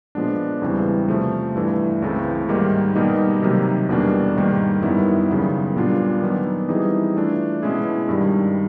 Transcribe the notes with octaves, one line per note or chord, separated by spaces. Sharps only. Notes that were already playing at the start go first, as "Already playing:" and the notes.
A#2 F3 G#3 B3 D4
E2 C#3 E3 G3 C4
C3 F3 A3
G2 E3 A3
C#2 C#3 E3 A3 C4
G#2 D#3 G3 A#3
B2 G3 A#3 D#4 G4
C3 D#3 F#3 A#3
E2 B2 G3 A#3 D4
G#2 D#3 G3 A#3
F#2 D#3 G3 B3 E4
D#2 C#3 F#3 B3
A#2 G3 B3 D4 F4
D#3 F#3 B3 D4
E3 G3 C4 D#4 G#4
E3 A3 D4 F4
B2 G#3 C#4 E4 G#4
G2 D#3 G3